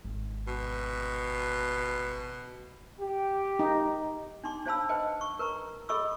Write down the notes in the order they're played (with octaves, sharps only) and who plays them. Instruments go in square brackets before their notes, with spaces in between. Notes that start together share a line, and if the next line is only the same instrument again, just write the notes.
[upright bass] G#1
[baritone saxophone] B2
[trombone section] G4
[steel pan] D#4
[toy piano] D4 D#4 C6 D6
D4 C5 F5 A5 B5 E6
B4 C5 D#5 G5 A5
C#6
A#4 B4 A#5 C#6
G#4 A4 D#5 B5 C#6 E6